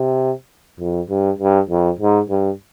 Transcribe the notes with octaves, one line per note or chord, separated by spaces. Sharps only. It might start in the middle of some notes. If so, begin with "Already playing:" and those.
Already playing: C3
F2
G2
G2
F2
G#2
G2